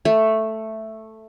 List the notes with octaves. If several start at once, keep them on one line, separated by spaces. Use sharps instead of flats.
A3